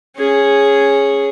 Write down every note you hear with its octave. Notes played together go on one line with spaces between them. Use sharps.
C#4 G#4